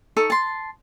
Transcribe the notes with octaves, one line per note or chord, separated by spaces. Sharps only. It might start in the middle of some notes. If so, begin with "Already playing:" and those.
D#4 A4 C#6
A5 C6